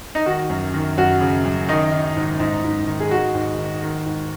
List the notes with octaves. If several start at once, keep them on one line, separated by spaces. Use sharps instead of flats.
D#4
D#3 F#4
F#2
D#3
F#2 F#4
C#3
F#2
D#3 D#4
D#3
G#2
G#2
G#2
D#3
G#4
D#3 F#4
G#2
D#3
D#3
G#2